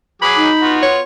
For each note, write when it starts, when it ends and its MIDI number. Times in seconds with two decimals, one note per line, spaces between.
0.22 0.49 54
0.22 0.49 68
0.22 0.74 83
0.22 0.49 86
0.37 0.80 63
0.62 1.01 59
0.62 1.01 65
0.62 1.01 66
0.82 1.02 73